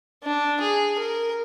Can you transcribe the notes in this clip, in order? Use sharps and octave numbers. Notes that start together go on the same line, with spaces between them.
D4
G#4
A#4